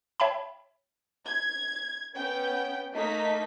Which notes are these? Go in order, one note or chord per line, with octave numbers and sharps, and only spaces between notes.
C#5 E5 G5 A5 B5
G#6
B3 C#4 G5
A3 A#3 D#4 D#5 B6